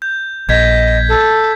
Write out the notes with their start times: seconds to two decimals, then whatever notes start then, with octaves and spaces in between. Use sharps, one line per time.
0.02 G6
0.49 A#1 D#5 G6 G#6 B6
1.08 A4